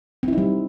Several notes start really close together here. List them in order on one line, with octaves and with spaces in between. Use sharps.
C4 E4 D#4 G3